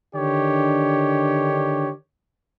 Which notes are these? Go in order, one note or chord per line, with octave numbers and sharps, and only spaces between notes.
D3 D#3 D4 G4 C#5